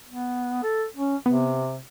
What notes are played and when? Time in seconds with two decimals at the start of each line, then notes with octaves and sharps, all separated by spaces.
0.08 B3
0.63 A4
0.96 C#4
1.26 C3 B3